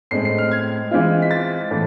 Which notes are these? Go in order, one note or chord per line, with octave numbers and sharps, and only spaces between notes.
A2 G#3 C4 C7
C7
F6
G#6
E3 G#3 C4 F4
B6
A6
A2 E3 A3